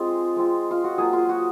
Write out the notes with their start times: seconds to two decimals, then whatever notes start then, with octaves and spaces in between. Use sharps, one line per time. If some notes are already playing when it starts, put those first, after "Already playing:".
Already playing: G#3 C4 F4 G#4
0.36 G#3 C4 F4
0.71 F4
0.84 F#4
0.98 F#3 A#3 F4 G#4
1.13 F4
1.29 F#4